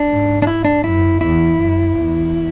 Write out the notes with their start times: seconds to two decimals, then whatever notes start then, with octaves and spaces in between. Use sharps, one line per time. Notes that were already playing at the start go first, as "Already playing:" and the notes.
Already playing: D4
0.10 G#2
0.42 D4
0.47 E4
0.65 D4
0.84 F#2 E4
1.21 E2 E4
1.57 F#2
1.95 E2